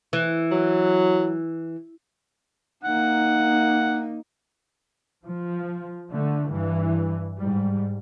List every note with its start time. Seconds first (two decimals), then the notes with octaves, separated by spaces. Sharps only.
0.13 E3
0.52 F#3
2.84 A#3 D#4 F#5
5.25 F3
6.12 D3 A3
6.50 G2 E3
7.37 G#2 G3